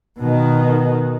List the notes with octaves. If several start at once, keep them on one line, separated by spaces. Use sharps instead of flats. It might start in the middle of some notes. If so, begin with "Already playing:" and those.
B2 D#3